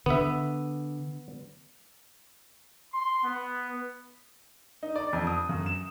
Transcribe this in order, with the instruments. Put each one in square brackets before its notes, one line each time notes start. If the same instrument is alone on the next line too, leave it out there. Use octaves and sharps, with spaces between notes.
[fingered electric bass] D3 [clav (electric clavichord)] B3 E5
[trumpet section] C6
B3
[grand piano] D#4
D5
F2
D#6
F#2
E7